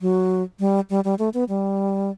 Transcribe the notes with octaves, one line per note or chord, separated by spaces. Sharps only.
F#3
G3
G3
G3
A3
B3
G3